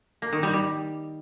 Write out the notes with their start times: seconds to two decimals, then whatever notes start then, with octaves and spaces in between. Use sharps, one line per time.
0.22 A#3
0.33 D#3
0.43 G3
0.53 G3